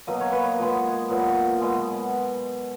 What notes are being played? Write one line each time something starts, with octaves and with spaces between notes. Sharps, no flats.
B2 F#3 A#3 D#5
C#5
B4
C#5
A#2 G#3 B3
A#2 F#3 B3
B2 G#3 B3